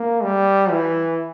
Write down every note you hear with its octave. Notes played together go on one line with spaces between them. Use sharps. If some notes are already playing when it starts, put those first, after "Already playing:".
Already playing: A#3
G3
E3